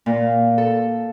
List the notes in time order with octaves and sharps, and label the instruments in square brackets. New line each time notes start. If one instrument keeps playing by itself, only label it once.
[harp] A#2
A4